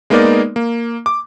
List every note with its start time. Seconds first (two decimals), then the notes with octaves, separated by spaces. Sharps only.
0.10 G#3 A#3 B3 D#4 A#4 D5
0.56 A#3
1.06 D6